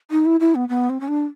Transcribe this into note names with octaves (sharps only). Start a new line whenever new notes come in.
D#4
E4
E4
B3
B3
C4
C#4
D4